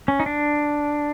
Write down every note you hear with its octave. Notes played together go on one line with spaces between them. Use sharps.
C#4
D#4
D4